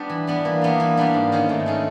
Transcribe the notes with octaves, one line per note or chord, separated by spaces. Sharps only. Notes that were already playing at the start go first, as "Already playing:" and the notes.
Already playing: G3 B3 D4
E3
G3 B3 D4
E3 A#3
G3 B3 D4
E3
G3 B3 D4
G#2
D#3 G#3 C#4
G#2 A3
D#3 G#3 C#4